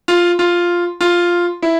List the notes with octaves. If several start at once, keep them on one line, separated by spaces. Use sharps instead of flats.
F4
F4
F4
E4